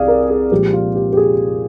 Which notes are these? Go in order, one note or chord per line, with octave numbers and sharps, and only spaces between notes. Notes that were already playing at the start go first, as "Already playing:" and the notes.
Already playing: C2 G#4 D5 F5
A#4
G#4
A#2 F3 G#3 C4 G4
F4
G4
G4
G#4